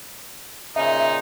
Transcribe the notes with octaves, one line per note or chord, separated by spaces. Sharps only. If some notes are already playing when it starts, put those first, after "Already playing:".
A#2 C#3 D#4 E5